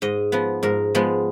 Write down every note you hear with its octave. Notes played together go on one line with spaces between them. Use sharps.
G#2 D#5
F3 B3
G#2 A#4
F3 G#3 B3